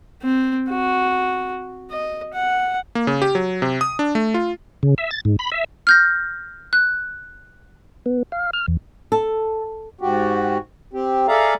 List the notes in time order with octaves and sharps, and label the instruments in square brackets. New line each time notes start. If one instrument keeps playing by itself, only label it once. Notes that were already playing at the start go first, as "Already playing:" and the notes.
[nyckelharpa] C4
F#4
D#5
F#5
[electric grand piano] A#3
C#3
G4
F#3
C3
D#6
D4
A3
F4
[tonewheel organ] C#3
E5
A6
G#2
B5
E5
[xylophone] F6 G6 A#6
F#6
[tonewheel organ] B3
F5
F6
E2
[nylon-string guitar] A4
[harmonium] G#2 F#4 G4
C4 G4
G#4 A4 D5 E5 F5 A#5